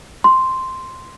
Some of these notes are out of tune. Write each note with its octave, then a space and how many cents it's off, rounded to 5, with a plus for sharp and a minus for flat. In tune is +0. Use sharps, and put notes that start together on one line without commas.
C6 +0